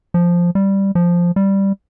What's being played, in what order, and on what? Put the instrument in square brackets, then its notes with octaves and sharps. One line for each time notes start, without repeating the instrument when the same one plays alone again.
[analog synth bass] F3
G3
F3
G3